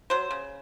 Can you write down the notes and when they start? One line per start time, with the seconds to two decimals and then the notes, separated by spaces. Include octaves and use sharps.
0.10 F#3 C5
0.31 C#3